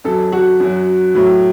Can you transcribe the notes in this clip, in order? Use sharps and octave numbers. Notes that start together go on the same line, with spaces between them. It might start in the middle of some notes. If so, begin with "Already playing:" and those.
F#2 F#3 A4
F#4
F#2 F#3
A2 F#3